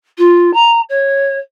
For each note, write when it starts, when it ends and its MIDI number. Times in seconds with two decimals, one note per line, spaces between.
0.18 0.51 65
0.54 0.81 82
0.89 1.38 73